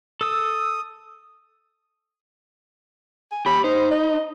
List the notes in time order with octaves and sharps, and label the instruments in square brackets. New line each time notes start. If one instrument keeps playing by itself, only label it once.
[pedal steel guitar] A4 E6 [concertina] D#6
[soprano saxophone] G#5
[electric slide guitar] G4 C#5 [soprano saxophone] B5
[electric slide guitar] D#4 [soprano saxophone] C5
[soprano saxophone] D#5